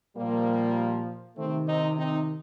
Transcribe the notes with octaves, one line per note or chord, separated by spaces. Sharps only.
A#2 F3 G3 A#3
C3 D#3 A3 C4
C4 D#4
C4 D#4